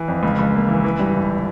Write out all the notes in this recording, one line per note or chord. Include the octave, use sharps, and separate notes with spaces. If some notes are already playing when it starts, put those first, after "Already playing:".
Already playing: E3
F2
C#2
C#2
A#3
E3
E3
G2
G1